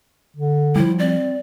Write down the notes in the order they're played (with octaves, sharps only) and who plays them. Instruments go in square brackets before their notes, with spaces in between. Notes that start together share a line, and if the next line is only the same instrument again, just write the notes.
[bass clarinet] D3
[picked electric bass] F3 G3 [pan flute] E4
[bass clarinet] C4 [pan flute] D5